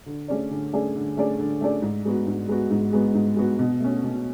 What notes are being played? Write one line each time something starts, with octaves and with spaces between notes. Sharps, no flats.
D3
A3 C#4 G#4 D5
D3
A3 C#4 G#4 D5
D3
A3 C#4 G#4 D5
D3
A3 C#4 G#4 D5
G#2
G#3 B3 F#4
G#2
G#3 B3 F#4
G#2
G#3 B3 F#4
G#2
G#3 B3 F#4
B2
A3 C#4
B2